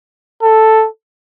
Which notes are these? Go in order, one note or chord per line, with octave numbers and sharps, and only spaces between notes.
A4